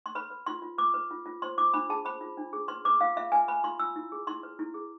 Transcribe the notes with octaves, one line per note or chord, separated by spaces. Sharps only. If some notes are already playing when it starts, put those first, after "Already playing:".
C6
B4 B5
B4
F4 C6
F4
B4 D6
B4
F4
F4
C5 C6
F4 D6
D4 B5
G#4 A5
C5 B5
F4
D4
G#4
B4 C6
B4 D6
F4 F5
F4 E5
B4 G#5
B4 B5
F4 C6
F4 E6
E4
G#4
E4 C6
B4
E4
G#4